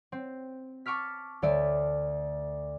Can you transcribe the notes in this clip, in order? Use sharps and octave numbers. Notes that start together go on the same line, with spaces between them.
C4
A5 C#6 D6 F6 B6
D2 A3 D5 E5